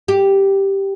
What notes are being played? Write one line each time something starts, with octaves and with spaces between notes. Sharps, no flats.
G4